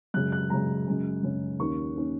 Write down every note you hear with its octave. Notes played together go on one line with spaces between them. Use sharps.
F#2 C#3 G#3 F#6
F#6
F#2 C#3 G#3 A#5
F#2 C#3 G#3 C#4
F#2 C#3 G#3 C#4
D#2 D#3 A#3 C#4 C#6
D#3 A#3 C#4